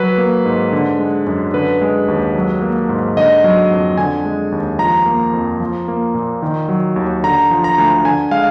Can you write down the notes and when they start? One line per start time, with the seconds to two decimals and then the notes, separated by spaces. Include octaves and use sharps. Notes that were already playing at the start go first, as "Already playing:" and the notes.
Already playing: F#3 B4
0.18 A#3
0.45 G#2
0.73 D3
0.99 G#3
1.27 F#2
1.53 D3 B4
1.81 G#3
2.08 D#2
2.35 F#3
2.62 A#3
2.89 G#2
3.17 D3 D#5
3.44 F#3
3.71 F2
3.97 D3 G#5
4.25 G#3
4.52 D#2
4.79 F3 A#5
5.06 A#3
5.33 F2
5.60 F3
5.88 A#3
6.14 A#2
6.42 D#3
6.69 F#3
6.96 D#2
7.23 D3 A#5
7.51 F3
7.64 A#5
7.78 D2
8.04 D3 G#5
8.31 G#3 F5